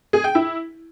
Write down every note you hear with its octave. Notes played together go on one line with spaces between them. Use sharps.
G#4
G5
E4